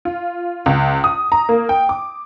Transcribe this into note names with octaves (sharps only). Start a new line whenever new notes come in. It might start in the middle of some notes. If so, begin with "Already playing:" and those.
F4
C#2
D#6
A#5
A#3
G5
D6